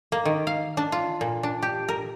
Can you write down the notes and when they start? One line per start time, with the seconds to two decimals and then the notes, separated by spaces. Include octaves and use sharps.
0.12 A#3
0.25 D#3
0.47 F5
0.77 D4
0.92 F4
1.21 A#2
1.43 D4
1.63 G4
1.89 A#4